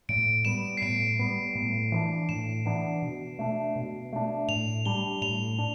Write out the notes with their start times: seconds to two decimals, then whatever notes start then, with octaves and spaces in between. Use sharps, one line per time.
0.09 A2 D7
0.45 G3 B3 E7
0.77 C7
0.82 A2 D7
1.19 G3 B3
1.55 A2
1.92 E3 B3 D4
2.29 A2 E7
2.65 E3 B3 D4
3.02 B2
3.39 A3 D4
3.76 B2
4.13 A3 D4
4.48 A2 F7
4.85 G3 D4 G7
5.22 A2 F7
5.58 D4